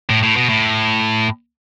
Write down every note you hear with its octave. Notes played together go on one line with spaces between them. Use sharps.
A2
A2
B2
A2